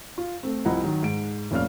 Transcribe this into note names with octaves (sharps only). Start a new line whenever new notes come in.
F4
A3 C4
C2 F3 E4 D#5 F#5 A#5
D#3 F#3
G#2 D7
F1 A#2 C#4 D5 F5 F6